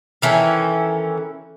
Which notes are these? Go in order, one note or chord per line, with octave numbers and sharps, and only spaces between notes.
D#3 E3 C#4 A4